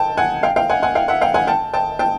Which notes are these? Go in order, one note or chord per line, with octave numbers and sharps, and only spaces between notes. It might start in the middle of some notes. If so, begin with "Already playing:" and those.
Already playing: G5 A5
F#5 G#5
F5 G5
F5 G5
F#5 G#5
F#5 G#5
F5 G5
E5 F#5
F5 G5
F#5 G#5
G5 A5
G5 A5
G5 A5